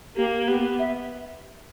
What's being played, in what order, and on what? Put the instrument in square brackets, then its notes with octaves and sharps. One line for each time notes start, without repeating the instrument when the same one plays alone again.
[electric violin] A#3 [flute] G4
[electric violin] B3 [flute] G4
[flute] E5